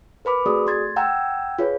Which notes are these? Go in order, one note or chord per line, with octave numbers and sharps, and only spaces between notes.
A#4 B4 B5 D6
A3 C4 F#4 G#4 D5 D#6
A3 C6 G#6 A6
F#5 G5 A#5 E6 G6 G#6
F4 G#4 B4 C#5